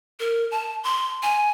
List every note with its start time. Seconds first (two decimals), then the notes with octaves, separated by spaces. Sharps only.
0.20 A#4
0.51 A5
0.84 C6
1.23 G#5